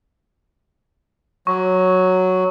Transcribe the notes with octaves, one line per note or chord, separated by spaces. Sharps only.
F#3 C#6